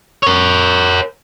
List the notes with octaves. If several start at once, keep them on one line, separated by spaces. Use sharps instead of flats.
A#4 C#5